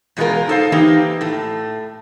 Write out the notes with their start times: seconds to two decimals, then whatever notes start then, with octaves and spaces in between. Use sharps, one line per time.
0.17 E2 B2 G#3 C4 F4 A#4
0.48 D#4 A4 C5 F5
0.72 E3 A#3 C4 D#4 G4
1.21 A2 A3